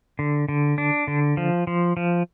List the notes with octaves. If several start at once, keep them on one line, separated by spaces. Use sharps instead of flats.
D3
D3
D4
D3
F3
F3
F3